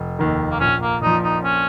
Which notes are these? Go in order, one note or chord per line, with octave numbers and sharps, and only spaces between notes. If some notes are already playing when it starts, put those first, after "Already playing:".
Already playing: F1
D#2 D#3
A#3
A#1 C#4
A#3
A#2 F3 D#4
D#4
C#4